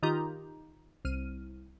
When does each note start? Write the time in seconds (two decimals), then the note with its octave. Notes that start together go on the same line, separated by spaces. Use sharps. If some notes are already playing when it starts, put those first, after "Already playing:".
0.03 D#3 D#4 F4 G4 A#5 G6
1.05 C2 F6 D#7